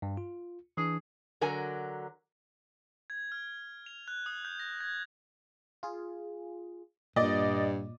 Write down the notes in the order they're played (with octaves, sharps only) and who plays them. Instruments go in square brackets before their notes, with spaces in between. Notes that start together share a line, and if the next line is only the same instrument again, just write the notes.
[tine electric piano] G2
F4
[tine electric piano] E3 D4 [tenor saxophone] G#4
[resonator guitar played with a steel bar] D3 F#3 A#4 G#5
[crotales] G#6
F6
F7
F#6
D#6
G6
A#6
G#6
[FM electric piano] F4 G#4
[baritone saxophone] G2 [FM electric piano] A#2 [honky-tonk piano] D5 D#5